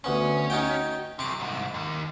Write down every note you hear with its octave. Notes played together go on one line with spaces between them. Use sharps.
D2 B3 C#4 C#6
D#4 F#4 G5
C3 F#3 C#6 D6
C2 G#2
D#2